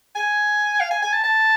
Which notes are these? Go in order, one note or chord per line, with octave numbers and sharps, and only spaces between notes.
G#5
F5
G#5
G#5
A5
A5